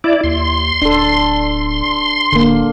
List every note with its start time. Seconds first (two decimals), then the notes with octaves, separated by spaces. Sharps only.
0.04 E4 D5
0.24 D#2 C6
0.82 D1 D4 A4
2.32 D1 D3 A#3